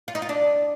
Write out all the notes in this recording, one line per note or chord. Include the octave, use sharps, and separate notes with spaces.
F4
D#4
F4
D4